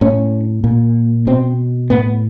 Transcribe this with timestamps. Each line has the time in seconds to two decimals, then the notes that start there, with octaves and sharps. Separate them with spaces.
0.01 A2 C#4
0.64 A#2
1.27 B2 C4
1.90 A2 B3